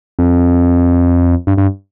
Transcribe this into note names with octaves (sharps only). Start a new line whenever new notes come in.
F2
G2
G2